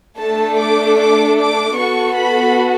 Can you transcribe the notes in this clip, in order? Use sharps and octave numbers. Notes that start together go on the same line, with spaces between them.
A3 D4 A4 A5
D6
D6
D6
B3 F#4 A4 C#6
B5